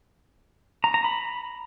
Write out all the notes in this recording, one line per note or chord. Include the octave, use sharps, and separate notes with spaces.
A#5
A#5
B5